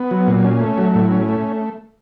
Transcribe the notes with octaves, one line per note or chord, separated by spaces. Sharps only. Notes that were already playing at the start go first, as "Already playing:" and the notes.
Already playing: B3
F#3
A#2
C#4
A3
F#3
A2
C#4
A3